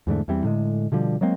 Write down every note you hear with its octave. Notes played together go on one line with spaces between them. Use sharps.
E2 G#2 D3 A3
E2 E3 G3 C4
A2 D3 G#3
B2 D3 F3 G3
F#3 G#3 A#3 C4